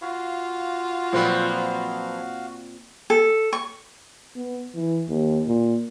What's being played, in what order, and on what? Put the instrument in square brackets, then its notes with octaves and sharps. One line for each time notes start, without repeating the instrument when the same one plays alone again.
[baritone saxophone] F4 [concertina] F#4 F5
[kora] A#2 C4 [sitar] F3 F#3 B4
[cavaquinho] A4
C#6
[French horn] B3
E3
D#2
A#2